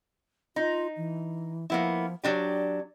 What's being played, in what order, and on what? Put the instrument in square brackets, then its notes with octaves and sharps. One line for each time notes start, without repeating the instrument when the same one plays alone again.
[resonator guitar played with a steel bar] D#4 [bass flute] F4
[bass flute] E3
[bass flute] F3 [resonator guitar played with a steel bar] A#3 B3 E4
[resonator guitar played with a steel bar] F#3 D4 G4 [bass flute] D5